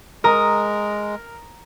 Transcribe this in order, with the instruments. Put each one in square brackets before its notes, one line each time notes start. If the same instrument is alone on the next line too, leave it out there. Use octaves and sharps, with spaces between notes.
[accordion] G#3 [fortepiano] A#4 [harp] A#5 D#6